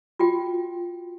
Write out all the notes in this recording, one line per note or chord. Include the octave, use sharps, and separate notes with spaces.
F4 F#4 G5